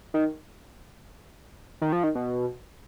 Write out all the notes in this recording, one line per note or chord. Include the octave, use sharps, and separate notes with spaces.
D#3
D#3
F3
D#3
B2